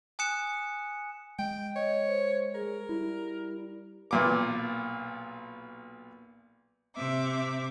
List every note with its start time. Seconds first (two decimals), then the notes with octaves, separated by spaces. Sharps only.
0.19 G#5 D#6 F#6 C#7 E7
1.39 G#3 G5
1.76 C#5 D#5
2.07 C5
2.55 G#4 A#4
2.89 G3 E4
4.11 B1 A#2 D6
6.94 C3 E5 D6